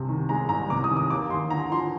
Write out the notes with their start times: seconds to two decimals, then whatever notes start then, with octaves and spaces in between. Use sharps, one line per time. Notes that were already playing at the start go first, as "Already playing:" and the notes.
Already playing: C2 C3
0.09 D#3
0.29 G#3 A#5
0.49 C2 A#5
0.70 C3 D6
0.84 D#6
0.90 D#3
0.97 D#6
1.10 D#2 D6
1.30 D#2 C6
1.50 D3 A#5
1.71 F3 C6